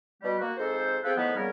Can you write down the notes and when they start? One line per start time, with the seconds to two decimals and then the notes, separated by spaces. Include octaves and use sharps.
0.22 B2 G3 G4
0.39 A#3 F#4
0.57 F2 G#2 A4 C5
1.04 C4 F4 G#4 A4 B4 G5
1.16 A2 D#3 F3 B3
1.35 A#2 C#3 G3 B3 C#4 A#4